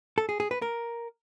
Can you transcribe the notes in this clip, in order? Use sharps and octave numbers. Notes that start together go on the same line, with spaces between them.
A4
G#4
G#4
B4
A#4